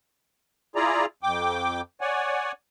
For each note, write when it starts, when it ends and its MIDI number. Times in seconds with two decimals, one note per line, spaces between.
0.76 1.06 64
0.76 1.06 65
0.76 1.06 68
0.76 1.06 74
0.76 1.06 82
1.23 1.81 41
1.23 1.81 79
1.23 1.81 86
2.01 2.52 73
2.01 2.52 74
2.01 2.52 78
2.01 2.52 80